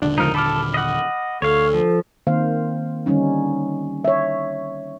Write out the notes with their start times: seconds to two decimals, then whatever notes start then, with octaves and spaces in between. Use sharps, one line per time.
0.02 D#1 A#1 D3 D4
0.18 C#2 F3 D#4 A#4 F6
0.35 A4 B5 D6 F6
0.74 D#5 F#5
1.42 D2 A4 C#5 F5
1.73 F3
2.27 D#3 A#3 C4 C5 F5
3.06 D3 D#3 G3 C#4 D#4
4.04 C#5 E5